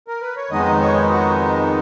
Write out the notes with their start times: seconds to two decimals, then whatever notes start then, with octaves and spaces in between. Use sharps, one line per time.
0.08 A#4
0.22 B4
0.36 C#5
0.51 F2 D#3 G#3 B3 D#4 D#5
0.80 C#5
1.10 F#4